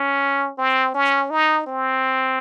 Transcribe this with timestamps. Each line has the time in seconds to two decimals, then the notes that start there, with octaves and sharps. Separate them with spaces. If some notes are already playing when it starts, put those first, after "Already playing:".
Already playing: C#4
0.58 C4
0.95 C#4
1.31 D#4
1.67 C4